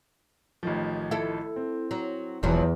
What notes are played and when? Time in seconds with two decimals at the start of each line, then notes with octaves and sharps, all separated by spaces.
0.63 A1 D#3 F3
1.11 E4 A4
1.56 C4
1.91 F#3
2.43 E1 E2 F3 F#3